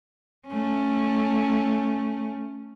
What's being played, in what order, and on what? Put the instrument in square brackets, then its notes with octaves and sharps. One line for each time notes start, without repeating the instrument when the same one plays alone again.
[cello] A3 C#4